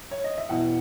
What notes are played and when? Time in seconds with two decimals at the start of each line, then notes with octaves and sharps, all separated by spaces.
0.11 C#5
0.24 D#5
0.38 E5
0.49 E2 B2 F#5